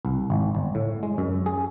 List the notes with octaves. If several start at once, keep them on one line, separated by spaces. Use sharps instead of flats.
C2
G#1
G1
A2
G#3
F#2
G#4